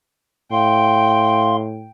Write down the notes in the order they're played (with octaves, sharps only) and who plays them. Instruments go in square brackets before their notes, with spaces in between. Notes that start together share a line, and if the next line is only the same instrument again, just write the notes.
[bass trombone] A2 [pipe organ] F5 C6 [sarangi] G5